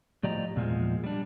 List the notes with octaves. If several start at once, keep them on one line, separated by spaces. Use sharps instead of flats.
A2 F3 G4 D5 D#5 A#5
E2 A#2 F3 G#3
G3 D4